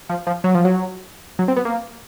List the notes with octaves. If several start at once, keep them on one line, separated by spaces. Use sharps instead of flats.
F3
F3
F#3
F3
F#3
F#3
C4
B3
A#3